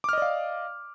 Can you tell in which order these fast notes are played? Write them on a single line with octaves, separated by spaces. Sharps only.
D6 F6 D#5 D5 F5